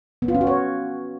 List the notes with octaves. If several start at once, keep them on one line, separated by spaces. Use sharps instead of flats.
B3
F4
C#4
F#4
C#5